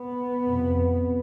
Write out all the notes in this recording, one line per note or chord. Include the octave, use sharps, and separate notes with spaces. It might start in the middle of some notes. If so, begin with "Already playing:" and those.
Already playing: B3
F2 C3